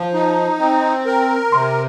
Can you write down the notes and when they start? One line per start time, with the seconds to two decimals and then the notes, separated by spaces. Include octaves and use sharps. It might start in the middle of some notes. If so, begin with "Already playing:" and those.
Already playing: F3
0.14 D#4
0.59 C4
1.06 A#4
1.52 C3 C6